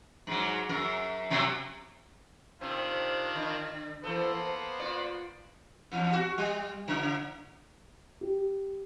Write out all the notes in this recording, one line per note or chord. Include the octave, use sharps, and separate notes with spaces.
G#2 F#3
F#2 A#4
F#2 C3 F#3
C3 D#3 C4 D4 F4
D3
E3 A#3 B3 A4 C5
F4 D5
E2
F#4
G3
C#3
G4